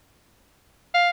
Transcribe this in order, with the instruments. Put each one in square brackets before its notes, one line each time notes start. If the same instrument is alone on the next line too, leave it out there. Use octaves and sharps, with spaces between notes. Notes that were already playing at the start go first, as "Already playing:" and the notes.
[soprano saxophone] F5